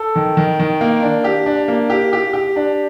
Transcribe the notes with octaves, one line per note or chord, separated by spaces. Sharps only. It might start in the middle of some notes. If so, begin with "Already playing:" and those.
Already playing: A4
D#3
D#3
D#3
A#3
D4
G4
D4
A#3
G4
G4
G4
D4